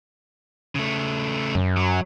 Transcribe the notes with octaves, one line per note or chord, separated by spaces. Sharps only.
C#3 A3
F#2
F#3